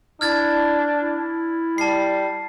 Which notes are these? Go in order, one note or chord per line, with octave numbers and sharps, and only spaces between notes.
D4 E4 F6 G#6 A6
E4
G3 A5 C7